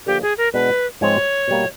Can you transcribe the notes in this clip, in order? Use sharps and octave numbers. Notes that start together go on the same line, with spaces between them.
D3 F3 A#3 G4
G#4
A#4
B2 G#3 B3 D4 B4
G#2 F3 G#3 C4 C#5
B2 G3 A#3